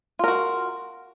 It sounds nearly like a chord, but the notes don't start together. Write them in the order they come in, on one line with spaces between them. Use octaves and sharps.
F4 A#4 F#4